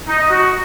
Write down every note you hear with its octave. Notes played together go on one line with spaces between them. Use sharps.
D#4
D#5
F#4